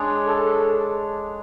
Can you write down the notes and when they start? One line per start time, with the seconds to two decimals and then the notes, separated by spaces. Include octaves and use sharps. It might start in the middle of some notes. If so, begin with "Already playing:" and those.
Already playing: G#3 D4 C#5
0.27 A4